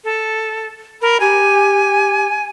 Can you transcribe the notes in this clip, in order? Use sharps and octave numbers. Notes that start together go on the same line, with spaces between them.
A4
A#4 B5
G4 G#5